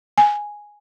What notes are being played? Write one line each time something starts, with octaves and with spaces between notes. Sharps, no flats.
G#5